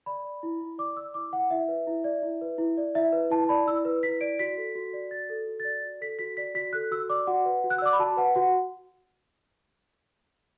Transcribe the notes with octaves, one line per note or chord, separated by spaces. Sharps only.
D5 B5
D5
E4
E4
D5 D6
D5 E6
E4 D6
E4 F#5
E4 E5
B4
E4
D5
E4
B4
E4
D5
E4 E5
B4
E4 A5
A5
D5 B5
E4 E6
B4
E4 B6
D5 D7
F#4 B6
A4
F#4
D5
F#4 A6
A4
F#4
D5 A6
F#4
A4 B6
F#4 B6
D5 B6
F#4 B6
A4 F#6
F#4 E6
D5 D6
F#4 F#5
B4
F#4
F#6
E6
D5 D6
B5
F#4 A5
B4 F#5
F#4 F#5